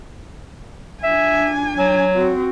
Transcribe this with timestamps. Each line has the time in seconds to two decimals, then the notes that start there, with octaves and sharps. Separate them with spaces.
1.04 D4 E5 G#5
1.79 F#3
2.15 C4 F#4